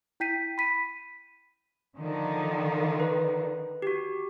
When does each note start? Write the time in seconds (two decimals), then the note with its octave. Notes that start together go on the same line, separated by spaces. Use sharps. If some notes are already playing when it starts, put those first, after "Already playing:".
0.20 E4 G5 G6 B6 C7 D#7
0.58 B5 B6 D#7
1.98 D3 D#3 F3
3.00 B4
3.82 F#4 G4